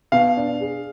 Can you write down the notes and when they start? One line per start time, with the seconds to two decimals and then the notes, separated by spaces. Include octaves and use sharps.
0.12 B2 F5
0.37 D4
0.60 G#4